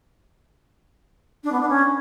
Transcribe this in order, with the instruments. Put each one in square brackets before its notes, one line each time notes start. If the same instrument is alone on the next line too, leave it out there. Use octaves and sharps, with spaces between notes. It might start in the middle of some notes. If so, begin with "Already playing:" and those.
[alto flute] D4
B3
D4
C#4